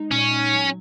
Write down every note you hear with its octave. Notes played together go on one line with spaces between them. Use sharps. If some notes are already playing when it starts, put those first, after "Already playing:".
Already playing: G#3 D#4
A#2 C#4
D#4
F#3